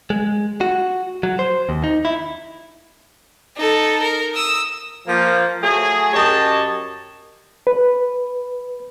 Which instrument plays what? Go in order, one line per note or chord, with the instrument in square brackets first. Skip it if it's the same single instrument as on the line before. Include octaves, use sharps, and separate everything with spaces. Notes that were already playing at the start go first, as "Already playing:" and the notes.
[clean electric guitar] G#3
F#4
F#3
C5
D#2
D#4
E4
[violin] D#4 A4
A#4
D#6 E6
[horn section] F3 A#3
F#3 A3 G#4
F#2 G4 C#5 D#5 A5
[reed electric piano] B4